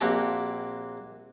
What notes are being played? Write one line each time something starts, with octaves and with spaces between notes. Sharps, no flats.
A#1 A#3 C4 F#4 G4 A5